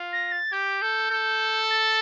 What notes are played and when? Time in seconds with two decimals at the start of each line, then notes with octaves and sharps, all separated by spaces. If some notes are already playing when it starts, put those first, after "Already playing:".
Already playing: F4
0.12 A#6
0.31 A6
0.52 G4 G6
0.82 A4
1.11 A4
1.70 A6